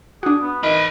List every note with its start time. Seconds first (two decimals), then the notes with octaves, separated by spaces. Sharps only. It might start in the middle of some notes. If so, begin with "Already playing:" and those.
0.23 D4 F#4 G#4
0.41 B3
0.63 E3 D#4 A#4 B5